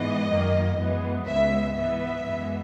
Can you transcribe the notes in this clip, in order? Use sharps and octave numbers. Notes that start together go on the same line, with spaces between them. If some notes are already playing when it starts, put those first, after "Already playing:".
Already playing: G#2 E3 G#3 B3 D#5
F#2 D#3 A#3
F#2 E3 G#3 B3
C#2 C#3 G#3 B3 E5
G#2 E3 B3 E5
F#2 E3 G#3 B3